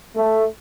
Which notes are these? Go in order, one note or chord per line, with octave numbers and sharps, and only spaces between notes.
A3